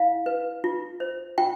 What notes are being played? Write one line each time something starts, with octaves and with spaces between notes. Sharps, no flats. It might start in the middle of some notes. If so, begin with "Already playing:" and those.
Already playing: E4 F5
B4
F4
C5
F4 G5